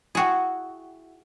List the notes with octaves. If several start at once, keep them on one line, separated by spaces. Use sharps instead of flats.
E4 F#4 G#4 F#5 G5